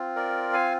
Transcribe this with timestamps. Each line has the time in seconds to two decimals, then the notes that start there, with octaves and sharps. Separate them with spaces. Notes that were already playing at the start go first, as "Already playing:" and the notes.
Already playing: C4 F4
0.16 A#4 D5
0.53 F5 G#5